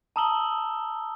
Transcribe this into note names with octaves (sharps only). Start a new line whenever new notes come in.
A5 A#5 D#6 E6 F#7 G7